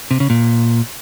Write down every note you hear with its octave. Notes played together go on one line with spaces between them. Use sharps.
C3
C#3
A#2